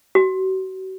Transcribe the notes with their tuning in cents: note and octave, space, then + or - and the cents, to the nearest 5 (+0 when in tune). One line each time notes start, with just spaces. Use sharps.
F#4 +35